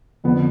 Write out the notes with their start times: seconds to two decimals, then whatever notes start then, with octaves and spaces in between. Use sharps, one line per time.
0.24 F2 D3 F3 B3